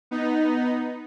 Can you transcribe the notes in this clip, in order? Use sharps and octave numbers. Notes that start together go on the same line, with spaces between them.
B3 D#4